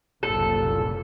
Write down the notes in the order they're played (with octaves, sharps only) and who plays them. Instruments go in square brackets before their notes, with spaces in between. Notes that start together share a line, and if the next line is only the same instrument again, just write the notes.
[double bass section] F#1 C2 A#2 [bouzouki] A4